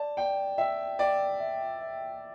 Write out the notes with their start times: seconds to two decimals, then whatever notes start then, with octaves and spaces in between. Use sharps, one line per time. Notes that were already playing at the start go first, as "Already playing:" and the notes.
Already playing: D5 A5
0.17 D5 G5
0.58 E5 G5
0.99 D5 G5
1.40 E5
1.81 E5